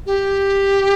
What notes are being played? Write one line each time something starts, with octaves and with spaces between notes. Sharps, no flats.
G4